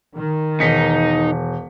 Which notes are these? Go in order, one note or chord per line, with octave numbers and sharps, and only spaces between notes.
D#3
E1 D#4 B6 C#7